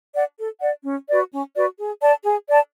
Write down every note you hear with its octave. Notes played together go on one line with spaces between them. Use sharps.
D5 F#5
A4
D5 F#5
C#4
F#4 B4 D5
C#4
F#4 B4 D5
G#4
D5 A5
G#4
D5 A5